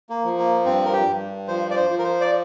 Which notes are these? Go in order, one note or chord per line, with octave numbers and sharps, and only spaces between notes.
A#3
F3
A#3
G2 C4
A#4
G4
G2
F3 C5
D5
C5
F3
A#4
C5
D5